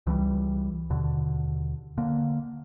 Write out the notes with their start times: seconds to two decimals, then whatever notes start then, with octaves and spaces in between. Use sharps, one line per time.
0.07 C#2 E3 F#3 G3
0.90 D#2 B2 D3
1.98 D3 A#3